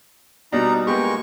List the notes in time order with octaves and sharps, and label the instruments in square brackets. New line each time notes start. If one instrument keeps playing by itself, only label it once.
[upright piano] B2 G3 D4 [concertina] D#4 A#5
[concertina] G#3 C#6 [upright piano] A#3 B3 G4